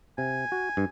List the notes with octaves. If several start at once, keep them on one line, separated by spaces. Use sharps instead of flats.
C3 G#5
F#4
G2